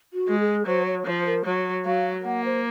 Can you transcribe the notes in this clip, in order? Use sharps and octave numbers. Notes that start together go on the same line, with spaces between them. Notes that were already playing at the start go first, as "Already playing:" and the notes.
F#4
G#3
G#4
F#3 C5
C#5
F3 C5 C#5
A#4
F#3 C#5
F#3 F5
A#3 F#5
C5